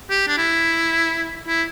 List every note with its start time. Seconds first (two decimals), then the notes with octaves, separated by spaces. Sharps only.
0.10 G4
0.27 D4
0.37 E4
1.47 E4